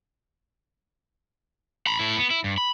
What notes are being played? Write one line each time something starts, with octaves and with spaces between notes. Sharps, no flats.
A#5 B5
A2 E4
B3
E4
G2
B5